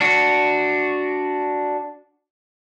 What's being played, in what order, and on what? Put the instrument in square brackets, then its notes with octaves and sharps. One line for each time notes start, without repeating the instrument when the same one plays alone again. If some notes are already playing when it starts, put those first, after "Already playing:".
[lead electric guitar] D4 F#4